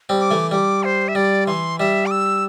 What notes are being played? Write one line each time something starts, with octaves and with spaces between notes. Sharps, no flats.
G3 C4
D6
E3 A3
G3 D6
C5
E5
G3 D5
E3 C6
G3 E5
D6
E6